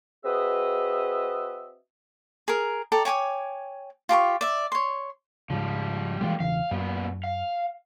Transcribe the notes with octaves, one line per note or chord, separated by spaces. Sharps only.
C4 F#4 G#4 B4 D#5 E5
G#4 A#4
A4 D5 G5 A#5
C#5 G5 G#5 D6
F4 G4 A#5 C#6
D5 E5
C#5 C6
G#2 C#3 F3 G3
E3 F3 G3 G#3 A#3 F4
E1 C#3 E3 F5
F#2 A#2 B3
F5